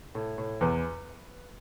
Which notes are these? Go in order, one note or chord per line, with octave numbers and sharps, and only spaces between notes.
A2
A2
E2 B4